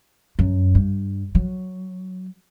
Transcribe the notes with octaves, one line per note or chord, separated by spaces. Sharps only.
F#2
G2
F#3